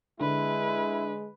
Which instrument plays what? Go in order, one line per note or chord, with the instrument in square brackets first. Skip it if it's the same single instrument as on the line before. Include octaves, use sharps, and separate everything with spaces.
[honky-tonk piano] D3 [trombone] G#3 [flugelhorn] E4 [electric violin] B4